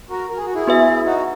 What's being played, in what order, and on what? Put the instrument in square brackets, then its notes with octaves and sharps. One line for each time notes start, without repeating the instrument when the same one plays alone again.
[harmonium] F#4 A#4
A#4
G#4
F#4
E4 G#4
[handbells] B3 F#4 B4 E5 G#5
[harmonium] D#4 F#4